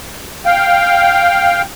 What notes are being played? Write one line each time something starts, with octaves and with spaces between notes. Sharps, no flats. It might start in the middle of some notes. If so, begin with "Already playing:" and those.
F5 G5